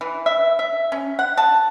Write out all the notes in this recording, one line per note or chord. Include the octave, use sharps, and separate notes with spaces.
E3
E5
E5
C#4
F#5
A5